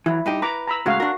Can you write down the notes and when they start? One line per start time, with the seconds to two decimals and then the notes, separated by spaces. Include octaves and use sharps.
0.06 E3 F#3 E4
0.26 G2 D#4 G4
0.42 B4 A#5 D6
0.67 A#5 B5 E6
0.86 A2 C#3 G#3 F#4 F5
1.00 D4 F#4 A#4